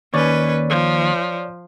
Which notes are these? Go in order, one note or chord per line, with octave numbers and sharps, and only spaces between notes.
D#2 C#4 B4 C#5 D5
F3